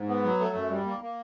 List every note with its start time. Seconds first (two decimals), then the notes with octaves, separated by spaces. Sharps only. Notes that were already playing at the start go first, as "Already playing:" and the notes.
Already playing: G#2
0.08 B3
0.25 F#3
0.40 A3
0.55 F#2
0.70 G3
0.85 A#3
1.01 A#3